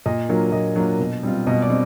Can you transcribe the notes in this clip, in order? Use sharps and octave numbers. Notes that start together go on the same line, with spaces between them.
A#2 D#5
F#3 A#3 D4 F4
A#2 D#5
F#3 A#3 D4 F4
B2
G3 C4 F4
B2 D#5
D5
G3 C4